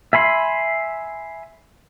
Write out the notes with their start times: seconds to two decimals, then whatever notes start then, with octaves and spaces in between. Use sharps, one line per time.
0.13 E5 G#5 B5 C6